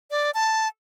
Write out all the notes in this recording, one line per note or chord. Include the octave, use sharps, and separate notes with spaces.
D5
A5